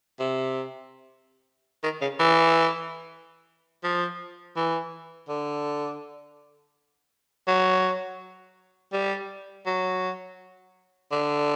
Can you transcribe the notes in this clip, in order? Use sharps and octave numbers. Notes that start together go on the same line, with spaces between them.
C3
D#3
C#3
E3
F3
E3
D3
F#3
G3
F#3
D3